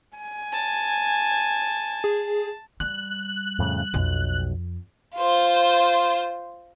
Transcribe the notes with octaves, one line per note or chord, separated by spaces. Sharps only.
G#5
A5
G#4
G3 F#6
F2 A2 C#3
B1 F2
F4 C5